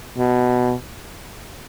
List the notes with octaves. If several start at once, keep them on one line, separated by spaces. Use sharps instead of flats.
B2